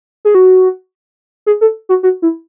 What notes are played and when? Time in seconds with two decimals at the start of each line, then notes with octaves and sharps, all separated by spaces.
0.25 G#4
0.35 F#4
1.46 G#4
1.61 A4
1.89 F#4
2.03 F#4
2.22 E4